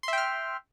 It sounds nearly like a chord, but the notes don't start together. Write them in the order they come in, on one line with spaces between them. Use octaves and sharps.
C6 E5 G5 F6